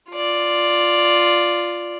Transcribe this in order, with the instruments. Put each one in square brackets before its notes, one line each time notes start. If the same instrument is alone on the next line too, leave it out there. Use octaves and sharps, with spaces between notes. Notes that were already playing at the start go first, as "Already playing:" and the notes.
[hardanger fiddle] F4 D5